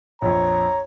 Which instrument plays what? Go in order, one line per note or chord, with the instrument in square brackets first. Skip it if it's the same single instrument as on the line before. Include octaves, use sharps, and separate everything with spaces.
[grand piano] A#1 F2 [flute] C#5 [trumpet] A#5